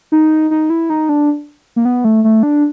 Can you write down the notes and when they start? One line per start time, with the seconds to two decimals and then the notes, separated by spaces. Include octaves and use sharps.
0.12 D#4
0.51 D#4
0.70 E4
0.90 D#4
1.09 D4
1.76 A#3
1.85 B3
2.04 A3
2.24 A3
2.43 D4